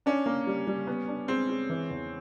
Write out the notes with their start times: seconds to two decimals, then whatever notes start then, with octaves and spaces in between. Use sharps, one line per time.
0.06 C#4 D4
0.26 A#3
0.47 G3
0.67 G3
0.87 B3
1.08 D4
1.28 G#3 C4
1.49 G#3
1.70 E3
1.91 E2